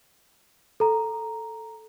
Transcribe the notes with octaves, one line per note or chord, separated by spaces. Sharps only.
A4 A#5